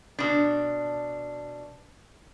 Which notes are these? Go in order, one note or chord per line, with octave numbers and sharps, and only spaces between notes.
B2 D4